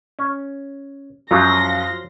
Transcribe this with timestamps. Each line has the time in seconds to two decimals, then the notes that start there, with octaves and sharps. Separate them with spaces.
0.19 C#4
1.31 F#2 F3 F#3 C4 F4 C6 A#6